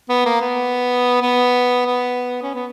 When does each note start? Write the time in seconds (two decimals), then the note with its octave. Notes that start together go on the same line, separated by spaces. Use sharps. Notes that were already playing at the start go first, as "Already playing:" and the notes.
0.09 B3
0.25 A#3
0.41 B3
1.22 B3
1.86 B3
2.42 C#4
2.55 B3